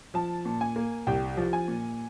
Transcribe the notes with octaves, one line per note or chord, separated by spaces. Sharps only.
F3 A5
A#2
G#5
A#3
C2 G5
F3
G#5
A#2